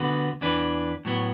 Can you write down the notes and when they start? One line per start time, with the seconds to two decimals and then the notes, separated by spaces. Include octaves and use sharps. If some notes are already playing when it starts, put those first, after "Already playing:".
Already playing: D2 D3 B3 F#4 B4
0.41 E2 E3 D4 B4
1.05 A2 F#3 B3